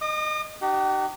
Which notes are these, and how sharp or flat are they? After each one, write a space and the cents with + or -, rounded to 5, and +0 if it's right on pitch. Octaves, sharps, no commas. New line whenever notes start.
D#5 -15 D#6 -45
D#4 -40 G4 -35 F#5 +10